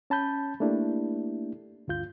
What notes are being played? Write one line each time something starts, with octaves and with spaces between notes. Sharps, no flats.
C#4 A5 B5 G6
A3 A#3 D4 E4 G4
D2 G2 F4 G6